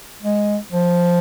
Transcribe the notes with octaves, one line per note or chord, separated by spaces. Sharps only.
G#3
F3